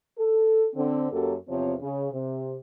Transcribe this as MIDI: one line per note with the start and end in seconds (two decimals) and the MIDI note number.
0.18 0.66 69
0.74 1.07 50
0.74 1.07 60
1.11 1.33 42
1.11 1.33 54
1.11 1.33 58
1.11 1.33 67
1.11 1.33 69
1.48 1.73 40
1.48 1.73 48
1.48 1.73 53
1.48 1.73 60
1.48 1.73 73
1.80 2.08 49
2.11 2.55 48